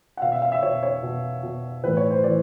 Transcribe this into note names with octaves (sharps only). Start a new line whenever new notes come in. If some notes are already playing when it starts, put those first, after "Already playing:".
F#5
B2 F5
E5
F5
E5
B2 C#5
C#5
B2
B2
A2 E3 B4
C#5
C5
E3 D5